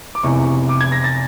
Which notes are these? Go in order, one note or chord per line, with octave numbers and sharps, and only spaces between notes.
D6
F1 E2 C3 C#6
D6
G#6
A#6
A6